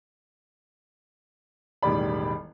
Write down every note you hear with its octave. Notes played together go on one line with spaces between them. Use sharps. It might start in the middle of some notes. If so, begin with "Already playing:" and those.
E1 A1 D#3 G3 D5 B5